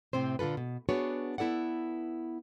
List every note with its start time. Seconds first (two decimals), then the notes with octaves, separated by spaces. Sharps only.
0.13 A2 C3 C4 C5
0.39 A#2 D3 F4 A4 B4
0.57 B2
0.89 B3 D4 F#4 G#4 B4 C#5
1.38 B3 E4 A4 D5 F#5